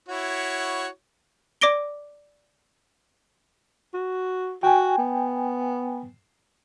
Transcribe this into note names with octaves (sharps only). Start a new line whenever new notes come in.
E4 F#4 C#5
D5 D6 A#6 D7 G7
F#4
F#4 G5 G#5
B3